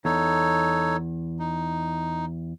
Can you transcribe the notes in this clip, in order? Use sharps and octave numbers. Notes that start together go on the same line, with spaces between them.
E2 D#4 A4 C#5
D#4